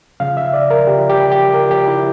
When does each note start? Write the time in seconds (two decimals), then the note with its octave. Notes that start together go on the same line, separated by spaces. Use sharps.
0.20 C#3 F3 F5
0.37 E5
0.54 D5
0.70 A#4
0.87 C#3 F3 G4
1.09 G4
1.32 G4
1.54 C#3 F3 A#4
1.71 G4
1.87 E4